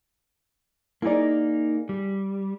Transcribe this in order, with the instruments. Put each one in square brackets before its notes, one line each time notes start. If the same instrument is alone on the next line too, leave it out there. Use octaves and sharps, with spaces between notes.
[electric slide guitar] A#3 D#4 [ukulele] E4 G#4 D5
[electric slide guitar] G3